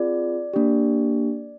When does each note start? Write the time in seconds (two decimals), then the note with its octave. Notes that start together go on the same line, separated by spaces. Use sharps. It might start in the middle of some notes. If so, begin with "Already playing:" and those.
Already playing: C4 F4 G#4 D5
0.54 A#3 D4 G4